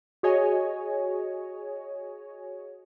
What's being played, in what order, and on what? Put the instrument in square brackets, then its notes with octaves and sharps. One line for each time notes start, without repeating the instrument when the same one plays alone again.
[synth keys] F#4 G#4 C#5 D#5 G#5